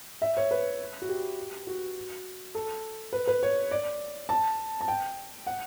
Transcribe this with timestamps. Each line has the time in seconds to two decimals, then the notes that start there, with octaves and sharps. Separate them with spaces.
0.22 E5
0.37 C#5
0.51 B4
1.02 F#4
1.09 G4
1.67 F#4
2.55 A4
3.13 B4
3.27 B4
3.43 C#5
3.71 D5
4.29 A5
4.81 A5
4.88 G5
5.47 F#5